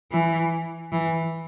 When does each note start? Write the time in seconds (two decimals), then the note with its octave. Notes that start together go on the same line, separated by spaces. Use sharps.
0.12 E3
0.92 E3